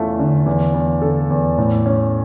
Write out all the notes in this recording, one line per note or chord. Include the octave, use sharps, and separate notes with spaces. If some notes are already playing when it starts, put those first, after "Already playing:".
Already playing: E2 A3 C#4 E4 F4 E5
D3
E2
E2
D3 A4
E2
A2
C#4